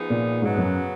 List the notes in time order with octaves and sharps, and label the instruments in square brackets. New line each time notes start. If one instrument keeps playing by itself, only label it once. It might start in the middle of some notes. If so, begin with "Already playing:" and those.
Already playing: [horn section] F3 B3 D#4 G#4
[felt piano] A#2
[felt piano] G#2 [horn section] C#3 F#3 B3
[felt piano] F#2